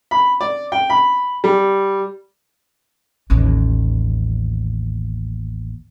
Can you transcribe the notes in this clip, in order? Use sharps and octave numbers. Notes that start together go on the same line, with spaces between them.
B5
D5
G5
B5
G3
A1 D#2